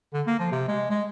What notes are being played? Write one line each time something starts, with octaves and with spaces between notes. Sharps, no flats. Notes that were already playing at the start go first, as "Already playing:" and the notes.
D3
A#3
F3
C3
G#3
G#3